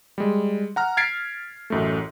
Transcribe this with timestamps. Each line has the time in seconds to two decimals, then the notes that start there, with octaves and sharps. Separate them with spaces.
0.18 G3 G#3
0.76 F#5 A#5 F6
0.97 F6 G#6 A6 B6 C7 D7
1.70 A1 F#2 A3